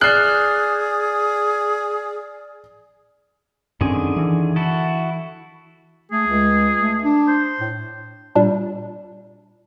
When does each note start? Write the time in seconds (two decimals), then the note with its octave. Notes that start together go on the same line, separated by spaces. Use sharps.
0.01 G#4 D5 F6 F#6 C7
3.81 F#2 D3 D#3 C4 C#4 G#4
4.16 E3
4.56 E4 F#4 A4
6.11 A3 G#4
6.27 C#2
6.79 A3
7.03 D4
7.28 C5
7.59 A2
8.35 A#2 G3 D4